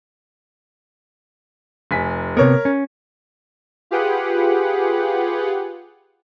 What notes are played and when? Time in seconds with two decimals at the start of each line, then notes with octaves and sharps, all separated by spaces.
1.91 F1 G#5 B6
2.37 C3 B3 A#4 C#5
2.65 C#4
3.91 F4 G4 G#4 B4 F#5